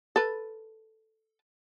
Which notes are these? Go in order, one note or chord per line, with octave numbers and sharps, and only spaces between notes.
A4 B4